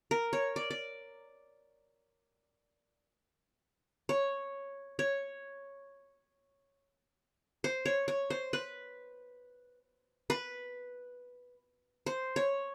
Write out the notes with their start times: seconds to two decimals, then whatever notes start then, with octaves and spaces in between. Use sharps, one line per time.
0.11 A#4
0.33 C#5
0.56 D5
0.71 D5
4.09 C#5
4.99 C#5
7.64 C5
7.86 C#5
8.08 C#5
8.30 C5
8.53 B4
10.30 B4
12.06 C5
12.36 C#5